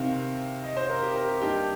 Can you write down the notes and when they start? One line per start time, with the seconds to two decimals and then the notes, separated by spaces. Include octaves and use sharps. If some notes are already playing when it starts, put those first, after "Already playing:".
Already playing: C3 D#3 C4 F5
0.64 D#5
0.77 C5
0.90 A#4
1.02 G4
1.16 A#4
1.29 G4
1.42 G2 D#3 A#3 D#4 G4